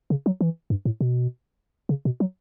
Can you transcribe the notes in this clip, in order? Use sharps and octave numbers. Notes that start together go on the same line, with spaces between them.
C#3
F#3
E3
G2
A2
B2
C#3
B2
F#3